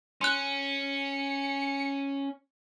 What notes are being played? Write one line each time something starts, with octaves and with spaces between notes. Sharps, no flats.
C#4 C6 F#6 C#7